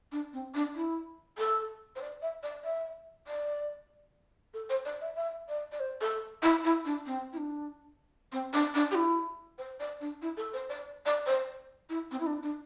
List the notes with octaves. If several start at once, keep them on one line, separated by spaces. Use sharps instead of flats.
D4
C4
D4
E4
A4
C5
D5
E5
D5
E5
D5
A4
C5
D5
E5
E5
D5
D5
C5
A4
E4
E4
D4
C4
E4
D4
C4
D4
D4
G4
E4
C5
D5
D4
E4
A4
C5
D5
D5
C5
E4
C4
E4
D4
D4